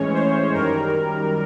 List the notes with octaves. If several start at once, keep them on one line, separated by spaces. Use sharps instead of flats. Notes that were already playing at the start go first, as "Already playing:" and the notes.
Already playing: A2 E3 G#3 C#4 C#5
C5
F#2 D#3 G3 A#4